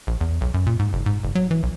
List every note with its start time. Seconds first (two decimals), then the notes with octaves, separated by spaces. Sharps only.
0.07 A#1
0.21 E2
0.41 B1
0.54 F#2
0.66 A#2
0.79 G#2
0.93 F#1
1.06 G#2
1.24 F#1
1.35 F#3
1.51 E3
1.63 B1